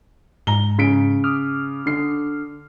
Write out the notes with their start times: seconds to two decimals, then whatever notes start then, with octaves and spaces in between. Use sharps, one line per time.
0.47 G#2 A#5 G7
0.78 C#3 B6 D7
1.24 D6 D#6 F6
1.86 D3 C7